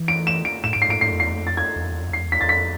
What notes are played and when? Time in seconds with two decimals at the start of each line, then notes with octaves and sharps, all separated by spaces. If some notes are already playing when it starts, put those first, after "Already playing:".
Already playing: E3
0.08 D7
0.27 E7
0.45 D7
0.64 A2 E7
0.73 G#2 D7
0.82 C7
0.89 G#2 D7
1.01 G#2 C7
1.12 F2
1.20 E2 C7
1.31 F2
1.47 A6
1.57 G#6
1.76 E2
1.84 F2
1.92 E2
2.02 F2
2.10 E2 C7
2.18 F2
2.27 E2
2.32 B6
2.41 E2 A6
2.49 F2 B6